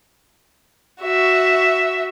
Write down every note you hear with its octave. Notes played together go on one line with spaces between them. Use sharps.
F#4 E5